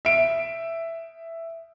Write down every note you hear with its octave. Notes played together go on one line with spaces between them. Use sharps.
E5 D7